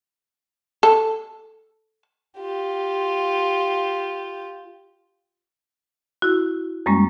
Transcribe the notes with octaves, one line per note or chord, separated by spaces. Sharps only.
A4
F4 G4
E4 F#4
F#2 G3 G#3 A#3 C#4